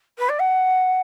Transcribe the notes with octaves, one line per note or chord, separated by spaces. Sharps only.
B4
D5
F#5